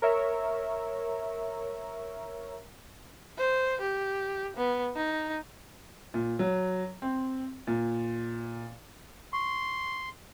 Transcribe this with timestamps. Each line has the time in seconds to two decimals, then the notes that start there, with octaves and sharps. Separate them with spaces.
0.02 A#4 C#5 E5
3.38 C5
3.81 G4
4.57 B3
4.96 D#4
6.14 A#2
6.39 F#3
7.02 C4
7.67 A#2
9.33 C6 C#6